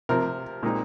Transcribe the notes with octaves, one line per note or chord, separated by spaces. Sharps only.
C3 F3 C4 A#4
A#2 G#3 C4 D#4